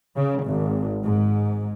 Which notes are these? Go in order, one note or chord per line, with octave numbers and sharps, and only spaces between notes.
C#3
G#1
G#2